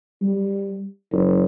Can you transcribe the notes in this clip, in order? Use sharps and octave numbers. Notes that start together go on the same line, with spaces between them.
G3
F#1